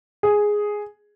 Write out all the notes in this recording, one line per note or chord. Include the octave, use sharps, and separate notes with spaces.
G#4